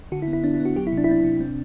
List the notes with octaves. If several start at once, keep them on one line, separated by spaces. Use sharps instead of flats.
D3 F#4
E4
B3
E4
B3 D4
E4
B3
F#4
F#3 G4
E4
C3
D4
E4
C4 D4
C3
C4